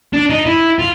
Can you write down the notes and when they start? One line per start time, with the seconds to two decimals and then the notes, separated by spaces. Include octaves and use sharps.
0.13 D4
0.30 D#4
0.46 E4
0.79 F4